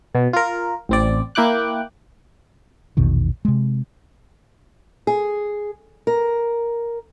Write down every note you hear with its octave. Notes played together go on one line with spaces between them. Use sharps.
B2
F4 A#4
A1 C4 D5
A#3 E4 G5 D6 F#6
A#1 E2 B2 D#3
C3 G#3
G#4
A#4